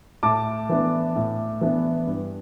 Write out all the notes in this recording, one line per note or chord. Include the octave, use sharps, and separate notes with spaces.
A2 A5 D6
E3 B3 D4
A2
E3 B3 D4
G2